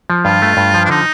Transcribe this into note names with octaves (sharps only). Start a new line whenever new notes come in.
F3
G2 F4
A3
G2
F3
D4
D3 D#4